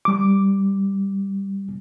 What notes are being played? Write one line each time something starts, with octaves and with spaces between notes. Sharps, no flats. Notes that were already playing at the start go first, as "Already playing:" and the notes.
G3 D6